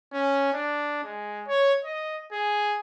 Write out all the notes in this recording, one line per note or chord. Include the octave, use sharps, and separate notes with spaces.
C#4
D4
G#3
C#5
D#5
G#4